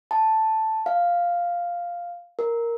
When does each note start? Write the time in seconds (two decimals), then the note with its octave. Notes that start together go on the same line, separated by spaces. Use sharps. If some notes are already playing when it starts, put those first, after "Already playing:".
0.11 A5
0.86 F5
2.39 A#4